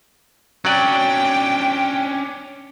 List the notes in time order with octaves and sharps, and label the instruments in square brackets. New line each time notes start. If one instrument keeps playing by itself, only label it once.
[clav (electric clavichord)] F#3 D5 [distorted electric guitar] C#4 D4 [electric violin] G5